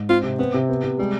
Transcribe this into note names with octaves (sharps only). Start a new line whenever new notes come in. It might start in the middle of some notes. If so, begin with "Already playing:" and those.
Already playing: G#2
C4 F4
C3
B3 C4
C3
B3
C3
G3 G#3